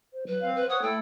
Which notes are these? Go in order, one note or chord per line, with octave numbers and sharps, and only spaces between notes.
C5
F#3 B4
C4 F5
B4 C5
C#5 F#5 D#6
A3 E4 A4 G5